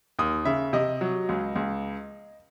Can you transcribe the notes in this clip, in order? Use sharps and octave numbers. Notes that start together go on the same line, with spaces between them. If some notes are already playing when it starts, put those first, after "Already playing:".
D#2 D#6
C#3 E5
C3 D#5
F#3
C#2
C#2